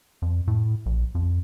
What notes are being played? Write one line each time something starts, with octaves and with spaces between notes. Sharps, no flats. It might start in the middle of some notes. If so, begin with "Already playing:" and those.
F2
A2
A#1
F2